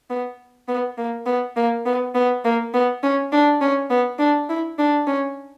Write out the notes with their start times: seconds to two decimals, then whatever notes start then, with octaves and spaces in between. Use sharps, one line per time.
0.10 B3
0.68 B3
0.97 A#3
1.26 B3
1.56 A#3
1.86 B3
2.15 B3
2.44 A#3
2.74 B3
3.03 C#4
3.32 D4
3.61 C#4
3.90 B3
4.19 D4
4.49 E4
4.79 D4
5.07 C#4